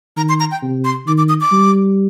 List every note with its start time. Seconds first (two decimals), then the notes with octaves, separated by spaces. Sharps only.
0.17 D#3 A#5
0.29 C6
0.40 A#5
0.51 G5
0.62 C3
0.85 C6
1.07 D#3 D6
1.18 D6
1.29 D#6
1.41 D6
1.52 G3